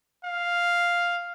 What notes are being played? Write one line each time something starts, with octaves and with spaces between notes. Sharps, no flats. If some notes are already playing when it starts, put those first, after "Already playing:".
F5